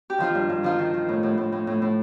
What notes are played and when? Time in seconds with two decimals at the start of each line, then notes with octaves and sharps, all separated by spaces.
0.10 G4
0.18 D#3 F3 F4
0.35 G2
0.49 G2
0.63 D#3 F3 F4
0.79 D#3
0.94 D#3
1.09 A2
1.23 A2
1.38 A2
1.52 A2
1.67 A2
1.82 A2